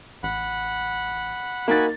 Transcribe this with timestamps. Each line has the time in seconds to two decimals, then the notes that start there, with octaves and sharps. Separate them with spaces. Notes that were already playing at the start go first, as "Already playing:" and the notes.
0.23 A1 F#5 B5
1.68 A#3 D#4 F#4 G#5 B5 A6